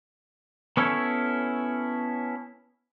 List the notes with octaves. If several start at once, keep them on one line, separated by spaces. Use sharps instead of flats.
B3 C#4 E4 A4 C#5